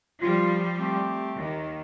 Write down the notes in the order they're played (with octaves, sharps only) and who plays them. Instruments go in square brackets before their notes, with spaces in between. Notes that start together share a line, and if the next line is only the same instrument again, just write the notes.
[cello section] F3 G3 [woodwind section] F4
[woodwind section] A3 C4 G4
[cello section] D#2 D#3